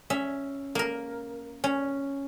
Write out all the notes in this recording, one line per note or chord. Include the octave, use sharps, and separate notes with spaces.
C#4 E5
A#3 A#4
C#4